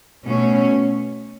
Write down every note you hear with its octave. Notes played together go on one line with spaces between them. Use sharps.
B2 A3 C#4